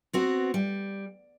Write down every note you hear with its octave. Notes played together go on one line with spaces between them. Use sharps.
B3 C4 F#4
G3